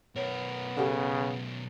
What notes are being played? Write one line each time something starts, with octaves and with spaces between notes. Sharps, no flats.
B1 B3 A#4 C#5
C#3 G4 A4 F#5